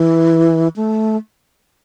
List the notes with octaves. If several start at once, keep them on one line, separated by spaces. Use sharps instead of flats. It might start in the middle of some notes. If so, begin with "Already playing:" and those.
Already playing: E3
A3